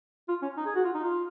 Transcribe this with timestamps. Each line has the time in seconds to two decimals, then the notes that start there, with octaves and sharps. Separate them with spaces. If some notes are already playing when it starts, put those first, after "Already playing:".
0.28 F4
0.42 C#4
0.57 D#4
0.66 G#4
0.75 F#4
0.84 F4
0.94 D#4
1.03 F4